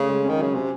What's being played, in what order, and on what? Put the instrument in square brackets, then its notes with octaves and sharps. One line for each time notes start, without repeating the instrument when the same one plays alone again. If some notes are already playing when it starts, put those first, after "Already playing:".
Already playing: [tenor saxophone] C#3 [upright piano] A3
[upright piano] G#3
[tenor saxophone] D#3 [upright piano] C#4
[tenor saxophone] C#3 [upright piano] F#3
[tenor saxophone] C3 [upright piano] C#4